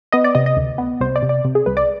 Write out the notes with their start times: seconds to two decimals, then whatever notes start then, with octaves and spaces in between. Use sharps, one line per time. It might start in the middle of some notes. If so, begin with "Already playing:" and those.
0.12 B3 D#5
0.24 D5
0.35 C3 D#5
0.46 D#5
0.57 D2
0.78 B3
1.00 C2 C5
1.16 D5
1.22 C3
1.29 D5
1.45 C3
1.55 G#4
1.66 C2 B4
1.77 D5